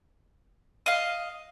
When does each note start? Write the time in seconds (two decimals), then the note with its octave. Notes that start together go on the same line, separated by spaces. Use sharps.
0.86 D#5 F5